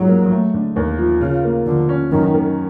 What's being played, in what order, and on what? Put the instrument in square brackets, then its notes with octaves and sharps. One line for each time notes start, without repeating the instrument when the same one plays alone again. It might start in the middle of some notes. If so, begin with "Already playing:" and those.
Already playing: [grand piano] G#2 F3 C#4 [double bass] F#3
[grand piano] A#3
A3
D3
D#2
F3
[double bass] C#3 [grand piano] F4
[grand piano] A#3
[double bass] D3 [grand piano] F3
[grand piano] C#4
[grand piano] F#2 [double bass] D#3
[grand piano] D#3